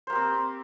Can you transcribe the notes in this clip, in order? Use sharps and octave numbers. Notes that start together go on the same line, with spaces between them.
A#3 C4 G4 C5